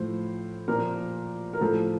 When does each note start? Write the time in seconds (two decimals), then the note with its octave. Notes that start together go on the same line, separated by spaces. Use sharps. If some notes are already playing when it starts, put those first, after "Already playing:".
Already playing: A2 F3 C5
0.68 A#2 F3 A#4
1.53 A#4
1.61 A2 F3 A4